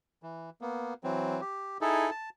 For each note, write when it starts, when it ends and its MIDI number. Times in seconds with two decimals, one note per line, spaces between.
0.23 0.50 52
0.61 0.94 58
0.61 0.94 59
1.04 1.41 52
1.04 1.41 54
1.04 1.41 60
1.41 1.78 67
1.81 2.10 63
1.81 2.10 64
1.81 2.10 68
1.81 2.10 69
2.11 2.30 81